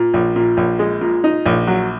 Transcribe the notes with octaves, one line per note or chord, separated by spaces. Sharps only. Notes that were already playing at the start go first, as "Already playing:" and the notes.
Already playing: A#2
A#1
A#2
A#1
G#3
A#2
D#4
A#1
F#3